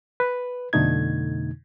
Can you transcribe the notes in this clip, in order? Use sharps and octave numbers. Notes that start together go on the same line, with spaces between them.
B4
F2 B2 D3 A3 D#4 G#6